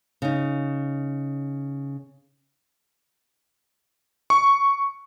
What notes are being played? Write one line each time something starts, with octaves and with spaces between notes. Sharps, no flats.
C#3 D#4
C#6